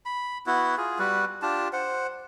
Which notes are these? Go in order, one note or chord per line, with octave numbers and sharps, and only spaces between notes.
B5
B3 E4 F#4
F4 G#4
G3 F#4 B4
D4 F4 G4 A5
C5 F#5